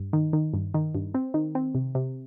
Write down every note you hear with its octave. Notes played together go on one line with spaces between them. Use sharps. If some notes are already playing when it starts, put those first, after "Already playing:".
Already playing: G2
D#3
D#3
G2
D#3
G2
C4
D#3
C4
C3
C3